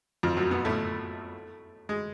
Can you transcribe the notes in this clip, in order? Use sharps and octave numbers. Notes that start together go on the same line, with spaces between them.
F2 F3
F#2 F#3
B2 B3
A2 A3
G#3